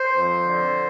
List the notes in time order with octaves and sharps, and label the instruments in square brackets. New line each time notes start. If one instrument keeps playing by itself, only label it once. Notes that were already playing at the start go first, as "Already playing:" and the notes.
Already playing: [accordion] C5
F2
D3